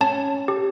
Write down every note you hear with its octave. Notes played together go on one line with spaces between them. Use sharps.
C#4 A5
G4